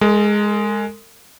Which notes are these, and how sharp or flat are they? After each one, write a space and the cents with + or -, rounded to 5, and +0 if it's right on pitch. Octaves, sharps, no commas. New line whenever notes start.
G#3 +0 A#4 -45